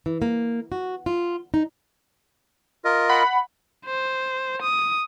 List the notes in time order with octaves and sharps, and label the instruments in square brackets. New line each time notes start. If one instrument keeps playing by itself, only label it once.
[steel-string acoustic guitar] E3
A#3
F#4
F4
D#4
[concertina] F4 A#4 D#5
[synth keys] F#5 B5
[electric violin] C5
D#6